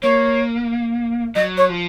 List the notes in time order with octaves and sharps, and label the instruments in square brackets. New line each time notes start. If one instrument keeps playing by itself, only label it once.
[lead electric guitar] A#3 [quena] C#5
[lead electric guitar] F#3 [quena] D#5
[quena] C#5
[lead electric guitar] F3